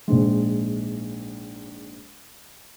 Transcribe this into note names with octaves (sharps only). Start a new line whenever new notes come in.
A#1 G#2 G#3